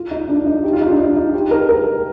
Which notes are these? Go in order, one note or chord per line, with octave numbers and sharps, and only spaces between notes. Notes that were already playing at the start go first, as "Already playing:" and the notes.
Already playing: F4
D#4
D4
D#4
G4
F4
D#4
D4
D#4
D#4
G4
A#4
A#4